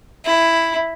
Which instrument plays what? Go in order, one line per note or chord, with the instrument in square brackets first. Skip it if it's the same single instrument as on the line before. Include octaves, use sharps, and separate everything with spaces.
[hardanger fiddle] E4